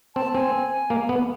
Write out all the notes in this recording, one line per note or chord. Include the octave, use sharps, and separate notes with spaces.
C4 A5
C4 G#5
A#3
B3